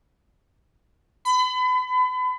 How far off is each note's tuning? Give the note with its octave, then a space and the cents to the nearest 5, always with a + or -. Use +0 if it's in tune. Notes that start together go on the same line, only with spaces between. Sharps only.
B5 +35